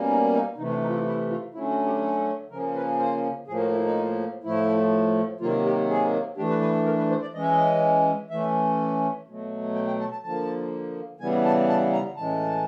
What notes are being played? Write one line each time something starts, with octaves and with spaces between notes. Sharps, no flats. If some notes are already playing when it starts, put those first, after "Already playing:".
Already playing: B2 G3 A#3 C#4
D#4
D#4
C3 E3 A3 D#4
D4
D#4
F4
E4
E4
F4
D3 F#3 A3 C#4 E4
F#4
G4
A4
C#3 F3 A#3 C#4 A#4
B4
C5
A2 F3 A#3 G#4
F#4
E4
D#4
A2 F3 A3 E4
C3 D#3 F#3 A#3 F4
G4
G#4
E3 A3 D4 G4
B4
B4
A4
A#4
B4
C5
D5
E3 G#3 C#4 D#5
E5
D#5
E3 A3 C#4 E5
B2 F#3 A3
G5
G5
A5
A5
D3 F3 A#3 A5
C#3 E3 G3 B3 G#5
A5
A5
A#5
A2 E3 G#3 C#4 A5